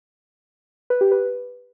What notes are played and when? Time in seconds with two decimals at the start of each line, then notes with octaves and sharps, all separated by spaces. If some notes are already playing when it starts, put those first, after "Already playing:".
0.90 B4
1.01 G4
1.12 B4